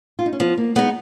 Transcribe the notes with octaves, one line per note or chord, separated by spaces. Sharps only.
F4
D#4
C#4
F3 B3
A#3
G#3 B3 D#4